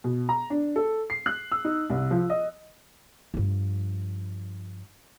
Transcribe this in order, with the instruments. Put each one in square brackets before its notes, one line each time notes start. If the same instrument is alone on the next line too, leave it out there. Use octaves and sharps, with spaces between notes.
[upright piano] B2
A#5
D4
A4
C7
F#6
E6
D#4
C2
F3
D#5
[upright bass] G2 F3